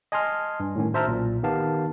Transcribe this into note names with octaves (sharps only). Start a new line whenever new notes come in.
D#5 G#5 A5 C6 F6
G2
A2 D#3 C#4
F#4 C5 E5 A5 A#5 F6
B1 A#2
D#3 B3 G4 F5 A5